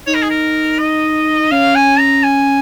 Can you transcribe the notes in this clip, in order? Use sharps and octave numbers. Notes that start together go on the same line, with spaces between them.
D#4 C#5
A#4
G#4
A#4
D#5
C#4 F5
G#5
A#5
G#5